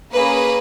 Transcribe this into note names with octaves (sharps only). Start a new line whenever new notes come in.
A#3 C#4 G#4 B4